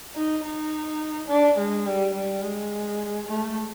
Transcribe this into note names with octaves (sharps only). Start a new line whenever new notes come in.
D#4
D#4
D4
G#3
G3
G3
G#3
A3